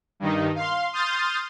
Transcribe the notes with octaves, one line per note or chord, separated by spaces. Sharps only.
G2 D#3 D#4
F5 C6
C6 D#6 F6 G6 A6